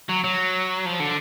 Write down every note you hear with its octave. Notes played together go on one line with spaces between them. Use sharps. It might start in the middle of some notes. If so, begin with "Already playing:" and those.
F#3
F#3
F3
D3